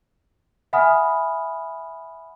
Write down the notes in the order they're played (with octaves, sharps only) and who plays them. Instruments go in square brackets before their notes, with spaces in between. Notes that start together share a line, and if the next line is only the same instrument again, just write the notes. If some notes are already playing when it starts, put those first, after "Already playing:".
[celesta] E5 F#5 G#5 B5 D#6 F6